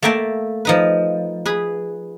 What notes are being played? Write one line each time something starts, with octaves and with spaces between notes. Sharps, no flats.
A3 A#3 E5 G5 A5
F3 D#4 B4
G#4 B4